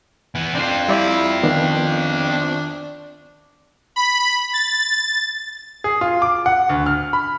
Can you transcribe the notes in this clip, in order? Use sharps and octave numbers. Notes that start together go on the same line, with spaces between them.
E3 B3
C4 D4 F4
G3 E4 D5
D#3 B3 D4
B5
A6
G#4
F4
D6
F#5
D2
F6
B5